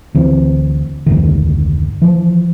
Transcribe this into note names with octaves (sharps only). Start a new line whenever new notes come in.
D2 E3 C4
F1 D2 G#2 D#3
E3 F3